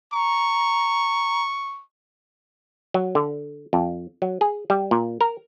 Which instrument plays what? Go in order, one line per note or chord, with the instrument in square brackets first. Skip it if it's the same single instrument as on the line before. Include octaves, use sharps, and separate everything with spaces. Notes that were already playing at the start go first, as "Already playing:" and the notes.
[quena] A#5 [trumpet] C#6
[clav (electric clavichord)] F#3
D3
F2
F#3
G#4
G3
A#2
A#4